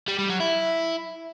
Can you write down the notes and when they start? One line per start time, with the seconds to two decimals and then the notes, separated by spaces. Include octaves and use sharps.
0.08 G3
0.19 G3
0.29 F#3
0.40 E4